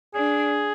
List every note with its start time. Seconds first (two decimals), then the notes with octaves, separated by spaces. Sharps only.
0.15 D4 G#4